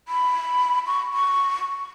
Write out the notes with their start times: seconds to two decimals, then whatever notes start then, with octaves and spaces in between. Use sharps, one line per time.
0.08 B5
0.87 C#6
1.13 C#6